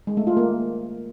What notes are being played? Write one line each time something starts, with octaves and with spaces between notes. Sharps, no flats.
G#3
A3
F4
A#3